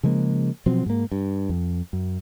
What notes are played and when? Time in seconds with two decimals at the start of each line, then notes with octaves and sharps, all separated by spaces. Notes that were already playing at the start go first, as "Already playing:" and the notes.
0.03 C#3 F3 G#3 A#3
0.66 B2 F3 F#3 C4
0.86 G#2 A#3
1.12 G2
1.49 F2
1.93 F#2